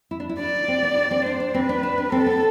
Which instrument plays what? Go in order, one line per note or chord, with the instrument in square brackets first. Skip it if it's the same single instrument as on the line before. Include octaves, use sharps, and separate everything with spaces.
[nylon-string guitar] E4
D4
E4
[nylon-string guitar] D4 [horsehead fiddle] D5
[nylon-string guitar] C4
B3
D4
C4
[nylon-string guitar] D4 [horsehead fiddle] C5
[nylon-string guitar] D4
[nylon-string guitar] C4 [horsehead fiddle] B4
[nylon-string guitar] D4
D4
D4
[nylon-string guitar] C4 [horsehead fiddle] A4
[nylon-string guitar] B3